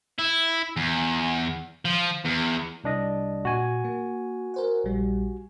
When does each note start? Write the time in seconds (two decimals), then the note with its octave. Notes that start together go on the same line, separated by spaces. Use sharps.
0.18 E4
0.76 E2
1.85 F3
2.25 E2
2.84 C2 D4 D#5
3.45 A#2 F#4 G#5
3.84 A#3
4.54 A#4 C5 F#5
4.84 A#1 G3